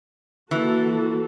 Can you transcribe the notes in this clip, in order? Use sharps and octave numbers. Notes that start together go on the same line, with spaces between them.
E3 A#3 F#4 A4